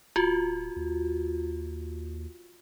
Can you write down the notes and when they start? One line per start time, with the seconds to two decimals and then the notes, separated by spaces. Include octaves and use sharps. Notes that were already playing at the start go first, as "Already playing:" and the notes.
0.16 D1 F4 F#4
0.76 D#2